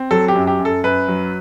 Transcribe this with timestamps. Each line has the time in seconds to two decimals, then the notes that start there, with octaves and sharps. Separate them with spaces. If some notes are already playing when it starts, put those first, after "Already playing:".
Already playing: C4
0.11 F#3 A4
0.28 G4
0.35 F#2
0.47 G4
0.59 F#2
0.65 A4
0.84 F#2 B4
1.08 F#3